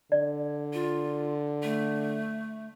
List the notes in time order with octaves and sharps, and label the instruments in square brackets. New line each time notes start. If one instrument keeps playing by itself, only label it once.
[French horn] D3 [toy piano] D5
[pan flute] F4
A3